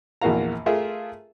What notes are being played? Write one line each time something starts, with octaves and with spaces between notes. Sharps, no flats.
A#1 E2 A#3 F#4 F5 A#5
A3 F4 G#4 A#4 E5